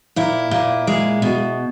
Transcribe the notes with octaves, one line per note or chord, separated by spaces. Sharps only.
A#2 E4
A#2
G#3
B2